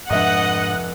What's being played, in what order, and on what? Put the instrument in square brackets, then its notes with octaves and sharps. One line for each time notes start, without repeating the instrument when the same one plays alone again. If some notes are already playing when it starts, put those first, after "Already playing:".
[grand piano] F1 E5 [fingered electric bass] G#2 G#3 D4 [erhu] D#5 [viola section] F#5